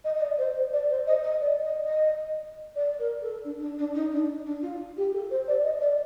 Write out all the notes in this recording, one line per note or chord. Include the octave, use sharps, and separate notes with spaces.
D#5
D#5
D5
C5
D5
C5
D#5
D#5
D5
D#5
D#5
D5
A#4
A4
D4
D4
D4
D#4
D4
D4
F4
G4
A4
C5
D5
D#5
D5